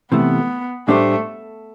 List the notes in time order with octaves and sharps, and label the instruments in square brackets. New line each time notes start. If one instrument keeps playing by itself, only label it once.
[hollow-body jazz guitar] C3 E3 A3 [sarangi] B3
[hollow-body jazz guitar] A2 G3 D4 G4 C5 [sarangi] A3